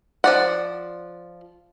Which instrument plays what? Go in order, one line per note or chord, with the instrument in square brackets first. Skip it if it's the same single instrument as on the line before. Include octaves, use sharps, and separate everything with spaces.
[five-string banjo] F3 D5 F#5